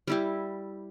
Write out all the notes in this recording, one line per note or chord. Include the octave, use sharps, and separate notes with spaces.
G3 E4 G4